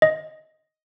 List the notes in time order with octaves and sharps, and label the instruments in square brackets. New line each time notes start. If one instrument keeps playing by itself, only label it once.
[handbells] D#5